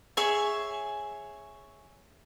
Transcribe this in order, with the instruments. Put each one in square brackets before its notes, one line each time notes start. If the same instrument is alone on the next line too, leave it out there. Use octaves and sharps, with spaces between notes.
[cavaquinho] G#4 C#5 E5 G#5